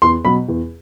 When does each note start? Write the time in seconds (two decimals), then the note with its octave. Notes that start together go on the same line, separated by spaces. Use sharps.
0.02 E2 C6
0.25 B2 F#3 B5
0.48 E2